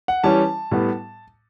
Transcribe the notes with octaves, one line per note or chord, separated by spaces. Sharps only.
F#5
E3 G3 C#4 A5
A2 G3 B3